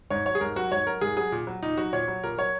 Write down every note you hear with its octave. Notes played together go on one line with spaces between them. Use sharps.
G#2 C#5
F#3 C#5
G#4
G#2 A#4
F#3 F#4
G#2 C#5
F#3 A#4
G#2 G#4
F#3 G#4
A#2
F#3
A#2 D#4
F#3 F#4
A#2 C#5
F#3
A#2 A#4
F#3 C#5